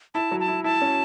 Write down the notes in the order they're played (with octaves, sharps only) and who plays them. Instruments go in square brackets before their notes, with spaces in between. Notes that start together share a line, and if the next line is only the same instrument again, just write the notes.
[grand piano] E4 [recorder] A5
[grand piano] F#3
[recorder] A5
[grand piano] E4
[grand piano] E4 [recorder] A5
[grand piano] C#4